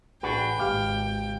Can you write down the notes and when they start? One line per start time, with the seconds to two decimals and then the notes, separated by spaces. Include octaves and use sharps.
0.23 A1 D4 F#4 G#4 B4 G5
0.59 G#1 C#2 G4 F5 D6